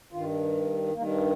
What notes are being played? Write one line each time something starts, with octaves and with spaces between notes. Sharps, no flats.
G2 D#3 F4
G2 D#3 A#3